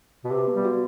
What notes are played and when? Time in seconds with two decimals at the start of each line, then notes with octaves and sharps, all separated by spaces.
0.24 B2
0.31 C3 B4
0.48 B3
0.54 G3
0.65 F#4